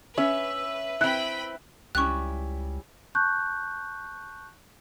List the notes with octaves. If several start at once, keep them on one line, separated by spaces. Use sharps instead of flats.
C#4 B4 E5
C4 E4 B4 G5 B5 F#6
C#2 G3 C#4 E4 C#6 F#6
A5 C#6 F#6 G6